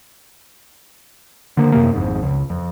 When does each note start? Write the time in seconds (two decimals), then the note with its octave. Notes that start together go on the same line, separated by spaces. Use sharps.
1.57 D3 A#3
1.72 F#2 C3 A#3
1.93 G#1 F2 G#2
2.23 C#2
2.50 F2